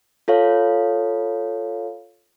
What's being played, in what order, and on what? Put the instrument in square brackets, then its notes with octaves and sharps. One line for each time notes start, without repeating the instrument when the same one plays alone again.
[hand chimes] F4 A4 C#5 F5